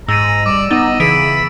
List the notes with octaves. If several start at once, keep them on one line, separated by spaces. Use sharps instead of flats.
G#2 A#5 E6 A6 D#7
G3 D5 D6
B3 D#4 D#5 D6 A6
C#3 E3 B5 D7